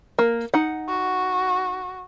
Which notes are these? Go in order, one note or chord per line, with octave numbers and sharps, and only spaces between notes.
A#3
D#4 F#5
F#4